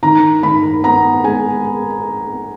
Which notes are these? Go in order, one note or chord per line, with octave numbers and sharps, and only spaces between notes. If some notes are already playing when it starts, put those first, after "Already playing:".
D#3 A#5
D#3 B5
B3 A#5
G#3 G#5